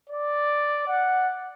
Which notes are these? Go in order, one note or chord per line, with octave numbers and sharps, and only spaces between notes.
D5
F#5